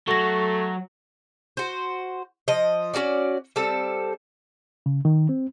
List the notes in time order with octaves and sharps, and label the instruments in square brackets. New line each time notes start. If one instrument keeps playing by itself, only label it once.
[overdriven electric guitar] F#3 [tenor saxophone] A3 [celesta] C#6 A#6
[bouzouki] F#4 C5
F3 D#5
C#4 F4 F#4 D5
G3 C4 A4
[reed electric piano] C#3
D#3
C4